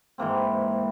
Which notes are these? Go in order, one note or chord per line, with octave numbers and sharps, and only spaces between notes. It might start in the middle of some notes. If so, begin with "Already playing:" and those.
G#2 E3 A#3 C4